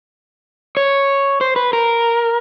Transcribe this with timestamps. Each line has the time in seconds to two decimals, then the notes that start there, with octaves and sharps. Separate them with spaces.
0.77 C#5
1.41 C5
1.56 B4
1.73 A#4